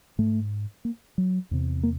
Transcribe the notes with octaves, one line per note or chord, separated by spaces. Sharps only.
G#2 A3
A#3
F#3
E2 C3
A#3